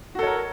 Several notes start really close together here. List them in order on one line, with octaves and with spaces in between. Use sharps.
F#4 A4 C#5 A#4